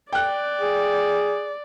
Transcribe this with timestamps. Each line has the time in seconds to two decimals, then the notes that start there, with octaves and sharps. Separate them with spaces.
0.13 D5 G5 F#6
0.60 G#4